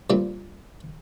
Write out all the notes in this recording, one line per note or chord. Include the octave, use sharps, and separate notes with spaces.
G2 A#2 C4